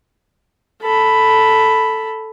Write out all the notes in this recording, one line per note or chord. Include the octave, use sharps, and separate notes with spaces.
A4 B5